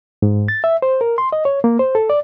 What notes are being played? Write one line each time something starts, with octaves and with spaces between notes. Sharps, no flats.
G#2
A6
E5
C5
A#4
C6
D#5
C#5
A#3
C5
A4
D5